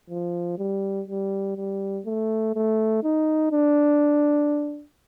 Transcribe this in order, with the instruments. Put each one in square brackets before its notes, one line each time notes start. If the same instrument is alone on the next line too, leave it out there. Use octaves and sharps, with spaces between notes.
[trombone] F3
G3
G3
G3
A3
A3
D#4
D4